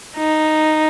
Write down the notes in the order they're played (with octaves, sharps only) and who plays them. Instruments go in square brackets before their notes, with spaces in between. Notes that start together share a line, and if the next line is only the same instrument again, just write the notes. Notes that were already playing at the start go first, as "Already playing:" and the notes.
[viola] D#4